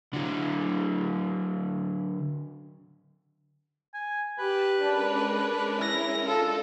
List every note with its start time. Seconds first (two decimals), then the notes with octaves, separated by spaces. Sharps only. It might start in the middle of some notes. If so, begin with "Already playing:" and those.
0.13 D3 F#3
3.94 G#5
4.39 G4 B4 A5
4.79 G#3 C#4 D4 A#4
5.81 E4 A#6
6.27 D4 D#4 F4 A4